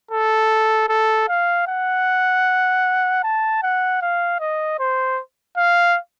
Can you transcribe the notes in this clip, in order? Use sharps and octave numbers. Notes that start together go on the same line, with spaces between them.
A4
A4
F5
F#5
A5
F#5
F5
D#5
C5
F5